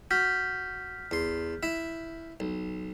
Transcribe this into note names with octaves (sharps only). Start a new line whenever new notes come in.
F#4 F6 G6 B6
E2 C6
E4 E5
B1